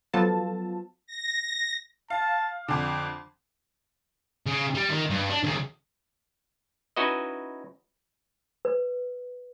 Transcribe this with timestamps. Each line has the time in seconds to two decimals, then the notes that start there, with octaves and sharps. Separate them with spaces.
0.13 F3 F#3 B3 F4 A4 A5
1.07 A#6
2.10 F5 A5
2.68 F2 D3 D6
4.46 C#3
4.75 G3
4.90 D#3
5.10 G2
5.30 D4
5.43 D#2 C#3
6.96 C#4 D#4 E4 F#4 B4 D#5
8.65 B4